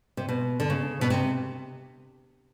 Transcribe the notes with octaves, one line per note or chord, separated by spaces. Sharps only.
C3
B2
D3
C#3
B2
C3